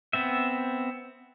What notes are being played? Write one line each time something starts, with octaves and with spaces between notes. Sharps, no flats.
B3 C4 E5